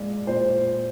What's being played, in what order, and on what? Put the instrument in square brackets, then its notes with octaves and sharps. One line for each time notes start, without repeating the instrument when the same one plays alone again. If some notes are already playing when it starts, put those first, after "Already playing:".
Already playing: [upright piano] A#2 G#3 D5
A#2 C5